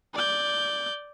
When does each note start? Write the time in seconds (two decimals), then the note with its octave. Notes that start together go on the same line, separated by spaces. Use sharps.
0.14 D5 G6